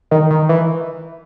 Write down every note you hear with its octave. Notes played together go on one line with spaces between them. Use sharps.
D#3
D#3
E3